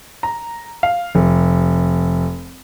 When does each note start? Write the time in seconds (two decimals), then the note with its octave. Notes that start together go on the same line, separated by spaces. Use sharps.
0.23 A#5
0.83 F5
1.15 F1